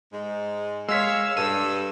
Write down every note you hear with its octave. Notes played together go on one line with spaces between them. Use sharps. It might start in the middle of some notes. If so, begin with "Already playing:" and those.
G#2 G#3
G#3 C#5 F5 E6 B6
G2 A4 E6 D#7